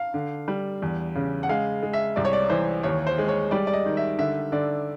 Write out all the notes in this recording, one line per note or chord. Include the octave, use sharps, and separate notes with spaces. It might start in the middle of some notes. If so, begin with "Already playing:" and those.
Already playing: F5
D3
G3
E2
C#3
F#5
G#3 F5
G#3
E5
C2 D5
C#5
D5
E3 C5
D#2 C#5
C5
G#3
C#5
G3 D5
D5
D#5
D#3
E5
D3 E5
D3 D5